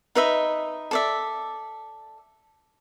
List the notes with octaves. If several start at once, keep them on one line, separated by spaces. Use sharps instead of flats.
D#4 B4 D#5 E5
A4 D5 E5